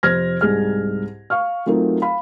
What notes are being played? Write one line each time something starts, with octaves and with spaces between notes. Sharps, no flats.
F2 C3 C5 F6 G#6 A#6
C2 G#2 G#4 F6
F5 C#6 F6
F#3 A3 C4 D#4 F4 A#4
F5 B5